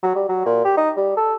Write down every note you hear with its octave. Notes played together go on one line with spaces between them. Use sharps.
F#3
G3
F#3
A#2
G4
D#4
G3
A4